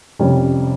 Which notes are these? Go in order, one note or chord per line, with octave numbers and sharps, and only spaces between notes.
F2 C3 G3 C#4